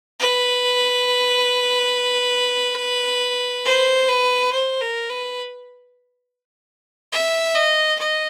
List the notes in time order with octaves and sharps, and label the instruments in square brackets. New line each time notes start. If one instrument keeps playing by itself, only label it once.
[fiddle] B4
C5
B4
C5
A#4
B4
E5
D#5
D#5